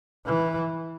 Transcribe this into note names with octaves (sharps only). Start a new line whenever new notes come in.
E3